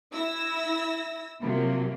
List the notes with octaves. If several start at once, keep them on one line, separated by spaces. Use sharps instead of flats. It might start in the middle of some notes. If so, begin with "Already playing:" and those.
E4 E6 A#6
C3 F3 F#3 A#3